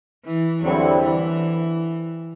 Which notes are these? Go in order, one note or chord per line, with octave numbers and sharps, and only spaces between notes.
E3
E2 D3 F#3 G3 C4 E4
E3